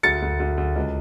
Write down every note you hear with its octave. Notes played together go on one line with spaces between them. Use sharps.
D2 A6 C#7
D2
D2
D2
C#2